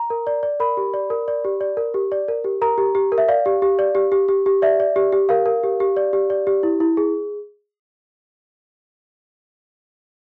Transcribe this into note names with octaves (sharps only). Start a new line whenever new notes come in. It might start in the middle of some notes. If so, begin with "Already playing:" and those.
Already playing: A#5
A#4
D5
D5
A#4 B5
G4
D5
A#4
D5
G4
D5
A#4
G4
D5
A#4
G4
A#4 A#5
G4
G4
A#4
E5
D5 F5
G4
G4
D5
G4
G4
G4
G4
D5 E5
D5
G4
G4
A#4 F5
A#4
G4
G4
D5
G4
D5
G4
E4
E4
G#4